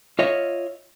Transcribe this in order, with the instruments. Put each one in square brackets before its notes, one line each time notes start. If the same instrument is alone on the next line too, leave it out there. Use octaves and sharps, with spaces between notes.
[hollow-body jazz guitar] F4 C#5 D#5 E5